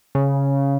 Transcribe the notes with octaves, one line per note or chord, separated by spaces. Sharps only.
C#3